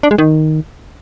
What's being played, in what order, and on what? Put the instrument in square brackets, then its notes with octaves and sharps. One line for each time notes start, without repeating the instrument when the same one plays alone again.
[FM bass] D4
G#3
D#3